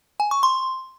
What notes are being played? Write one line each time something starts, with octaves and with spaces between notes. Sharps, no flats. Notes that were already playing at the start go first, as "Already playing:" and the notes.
G#5
C#6
C6